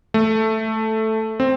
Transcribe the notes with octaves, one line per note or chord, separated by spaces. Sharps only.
A3
C4